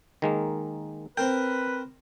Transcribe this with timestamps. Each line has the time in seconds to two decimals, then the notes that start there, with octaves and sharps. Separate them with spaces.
0.22 D#3 G#3 A#3
1.17 C4 A#4 B4 G5